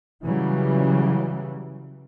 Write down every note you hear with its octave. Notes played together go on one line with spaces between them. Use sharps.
C#3 E3 F#3 G3